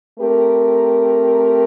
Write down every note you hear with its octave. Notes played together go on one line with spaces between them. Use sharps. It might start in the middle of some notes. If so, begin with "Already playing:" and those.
A3 C4 G4 A#4